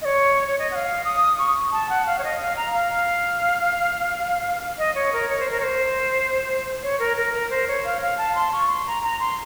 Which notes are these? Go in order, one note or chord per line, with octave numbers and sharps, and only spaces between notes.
D#5
C#5
C#5
D#5
F#5
F5
D#6
C#6
A5
F#5
F5
C#5
D#5
F5
A#5
F5
D#5
C#5
A#4
C#5
C5
A#4
C#5
C5
C#5
A#4
A#4
A#4
C5
C#5
F5
F5
A5
C6
C#6
C6
A#5
A#5
C6